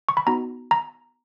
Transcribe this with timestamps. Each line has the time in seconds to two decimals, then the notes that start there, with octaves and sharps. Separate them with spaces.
0.09 C#6
0.17 B5
0.27 B3 D#4 F#4 A#5
0.71 A#5